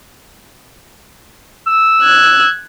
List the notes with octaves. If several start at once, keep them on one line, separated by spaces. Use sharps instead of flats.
E6
F#6 G#6